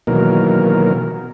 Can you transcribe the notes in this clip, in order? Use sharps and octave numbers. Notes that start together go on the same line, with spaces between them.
B2 D#3 E3 F#3 A#3 A#4